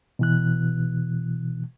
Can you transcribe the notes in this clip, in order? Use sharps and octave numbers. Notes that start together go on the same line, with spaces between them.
B2 E3 F#6